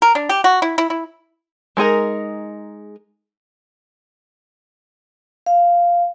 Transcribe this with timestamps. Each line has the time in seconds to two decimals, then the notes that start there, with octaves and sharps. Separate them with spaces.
0.02 A#4
0.15 D4
0.29 G4
0.44 F#4
0.62 E4
0.78 E4
0.90 E4
1.77 G#3 D#4 G#4 A#4
5.46 F5